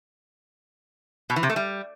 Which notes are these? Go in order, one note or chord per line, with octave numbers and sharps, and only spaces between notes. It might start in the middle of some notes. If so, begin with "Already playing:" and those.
B2
E3
C3
A3
G3